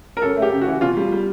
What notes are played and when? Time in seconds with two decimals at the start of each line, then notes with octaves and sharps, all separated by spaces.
0.17 A#4
0.22 F#2 A4
0.37 A3
0.42 G4
0.52 C#3
0.61 F#4
0.67 E3
0.81 B2 F4
0.97 G3
1.12 G3